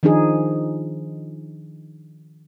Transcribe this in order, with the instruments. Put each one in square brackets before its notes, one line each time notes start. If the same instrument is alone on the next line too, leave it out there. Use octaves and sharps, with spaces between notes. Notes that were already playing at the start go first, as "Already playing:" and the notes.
[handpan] D#3 F3 D4 D#4 G#4